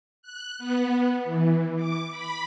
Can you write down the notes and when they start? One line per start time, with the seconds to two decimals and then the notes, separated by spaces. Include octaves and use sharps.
0.23 F#6
0.59 B3
1.24 E3
1.76 D6
2.11 B5